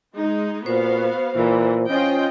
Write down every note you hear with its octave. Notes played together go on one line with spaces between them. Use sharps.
G#3 D#4
A#2 B3 F#4 C5 F5
A#2 E3
C#4 F4 D#5 G5